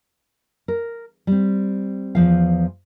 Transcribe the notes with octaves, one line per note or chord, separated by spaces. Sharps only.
A#4
G3 C4
E2 F3 F5